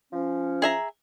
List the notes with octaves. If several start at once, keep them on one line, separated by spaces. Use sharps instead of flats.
F3 C#4
G#4 E5 A#5